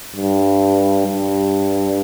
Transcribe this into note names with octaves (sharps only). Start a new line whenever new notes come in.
G2
G2